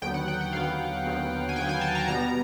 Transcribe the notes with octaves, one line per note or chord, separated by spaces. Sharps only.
D#2 D3 F#3 B3 G5
F#5
G5
F#5
D#2 D3 F#3 B3 F5
D#2 D3 F#3 B3
G#5
D#2 D3 F#3 B3 G5
G#5
A5
A#5
B2 G3 B3 A#5